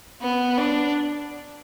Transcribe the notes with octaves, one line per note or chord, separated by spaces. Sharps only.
B3
D4